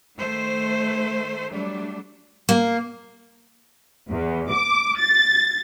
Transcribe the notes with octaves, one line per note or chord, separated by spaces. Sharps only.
D#3 A3 C5
F#3 G3 A3 D4
A#3
E2
D6
A6